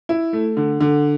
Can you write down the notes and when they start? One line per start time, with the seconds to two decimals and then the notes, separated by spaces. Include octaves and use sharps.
0.09 E4
0.33 A3
0.57 D3
0.81 D3